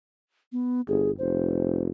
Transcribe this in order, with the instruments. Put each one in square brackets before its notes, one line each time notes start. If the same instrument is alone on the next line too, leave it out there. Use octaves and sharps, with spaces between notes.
[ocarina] B3
[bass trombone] G1 [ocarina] G#4
[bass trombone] F1 [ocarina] C5